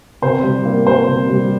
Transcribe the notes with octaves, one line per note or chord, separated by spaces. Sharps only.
C3 C5
G3
A#3
G3 C5
C3
G3